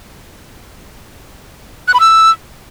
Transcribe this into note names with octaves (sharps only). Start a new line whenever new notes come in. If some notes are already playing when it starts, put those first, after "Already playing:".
F#6
B5
E6